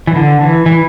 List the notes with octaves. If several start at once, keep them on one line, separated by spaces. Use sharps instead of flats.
E3
D3
E3
E3